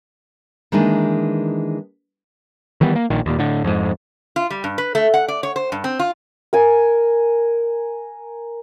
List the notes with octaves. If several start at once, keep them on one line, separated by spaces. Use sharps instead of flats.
D#3 E3 G#3 A#3 D4 D#4
D#3 E3 G3 B3
A#3
A#1 A#2 D#3
D#2 A#2
A2 D3
F2 G#2
F4
G3
G2
B4
A3
F#5
D5
C#5
C5
G2
C4
F4
A#4 G#5